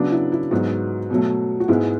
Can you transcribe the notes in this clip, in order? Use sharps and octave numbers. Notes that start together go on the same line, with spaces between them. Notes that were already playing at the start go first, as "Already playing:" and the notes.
Already playing: C#3 F#3 B3 D4
E4
E4
G#2 F#3 B3 F#4
B2 F#3 A3
F#4
G#2 G#3 B3 E4